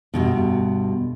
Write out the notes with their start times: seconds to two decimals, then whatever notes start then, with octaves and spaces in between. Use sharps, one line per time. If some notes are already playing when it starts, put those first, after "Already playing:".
0.14 D2 G2 B2